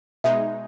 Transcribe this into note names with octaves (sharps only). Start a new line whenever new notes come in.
B2 G#3 D#4 E5